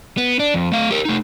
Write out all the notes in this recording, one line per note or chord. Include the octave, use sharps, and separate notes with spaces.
B3
D4
F2
A3 F5
G4 A#4
A3 D#4